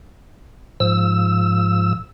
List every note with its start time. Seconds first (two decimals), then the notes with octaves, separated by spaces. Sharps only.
0.80 G#2 F3 E6